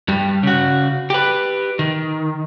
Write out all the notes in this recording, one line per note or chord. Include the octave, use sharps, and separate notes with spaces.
G2 G3
C#3 F#4
G4 B4
D#3